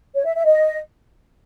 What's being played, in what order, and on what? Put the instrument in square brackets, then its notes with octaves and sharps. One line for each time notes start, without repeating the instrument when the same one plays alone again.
[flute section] C#5
E5
E5
D#5